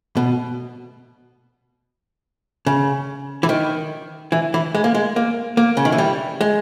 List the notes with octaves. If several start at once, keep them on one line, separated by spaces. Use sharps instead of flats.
B2
C#3
E3
D#3
E3
E3
G#3
A#3
G#3
A#3
A#3
C#3
D#3
E3
G3
G#3